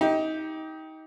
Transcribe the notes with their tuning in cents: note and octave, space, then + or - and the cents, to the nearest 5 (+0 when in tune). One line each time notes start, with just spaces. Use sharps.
D#4 +25 G4 +0